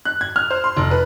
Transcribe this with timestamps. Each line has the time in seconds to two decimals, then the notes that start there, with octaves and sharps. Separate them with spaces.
0.05 F#6
0.21 G#6
0.36 F6
0.51 C5
0.64 C6
0.77 F1
0.91 B4